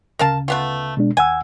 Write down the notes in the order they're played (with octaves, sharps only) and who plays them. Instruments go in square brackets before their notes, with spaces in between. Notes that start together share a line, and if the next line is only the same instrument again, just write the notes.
[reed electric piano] D2 C#3 [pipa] A#4 F5 A5
[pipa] A3 B3 F4
[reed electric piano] B2 G#3 D4
[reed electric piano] D#2 F#5 E6 [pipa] G#5